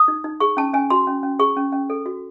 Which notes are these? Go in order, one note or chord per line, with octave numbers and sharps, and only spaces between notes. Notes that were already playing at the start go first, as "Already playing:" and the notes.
Already playing: D#6
D#4
D#4
G#4 C#6
C#4 A5
C#4 G#5
F#4 C6
C#4
C#4
G#4 C#6
C#4
C#4
A4
F#4